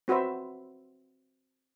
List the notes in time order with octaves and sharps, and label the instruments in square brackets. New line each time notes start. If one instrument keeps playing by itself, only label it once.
[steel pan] C4 F#4 B4 C5 E5